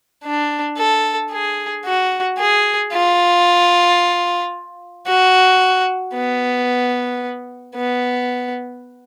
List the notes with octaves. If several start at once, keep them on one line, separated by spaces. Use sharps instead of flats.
D4
A4
G#4
F#4
G#4
F4
F#4
B3
B3